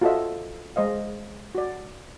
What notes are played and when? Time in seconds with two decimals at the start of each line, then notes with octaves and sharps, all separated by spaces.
0.01 F4 F#4 A4 C#5 D#5 E5
0.76 G#3 C5 D#5 F5
1.55 F#4 D5